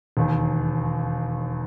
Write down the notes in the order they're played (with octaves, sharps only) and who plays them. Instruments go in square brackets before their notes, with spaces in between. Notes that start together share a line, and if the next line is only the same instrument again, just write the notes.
[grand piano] E1 D#2 D#3